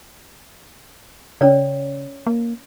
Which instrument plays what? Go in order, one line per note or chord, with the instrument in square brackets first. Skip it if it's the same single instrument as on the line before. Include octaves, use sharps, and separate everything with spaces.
[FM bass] C#3 [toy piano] C#4 C#5 D5
[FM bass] A#3